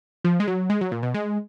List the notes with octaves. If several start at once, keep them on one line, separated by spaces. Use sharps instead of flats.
F3
G#3
F#3
G#3
F#3
A#2
B2
G#3